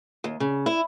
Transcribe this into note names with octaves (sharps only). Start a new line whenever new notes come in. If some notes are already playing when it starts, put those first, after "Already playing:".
D#2
C#3
E4